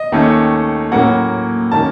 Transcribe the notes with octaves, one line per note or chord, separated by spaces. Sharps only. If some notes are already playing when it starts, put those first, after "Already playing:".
Already playing: D#5
D#2 D#3 A3 C#4
A2 F#3 A#3 C#4 F#5
D#3 A#3 C#4 A5